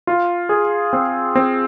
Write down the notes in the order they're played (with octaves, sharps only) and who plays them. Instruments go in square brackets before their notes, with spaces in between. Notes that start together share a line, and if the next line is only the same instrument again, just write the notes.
[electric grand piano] F4
G#4
C4
C4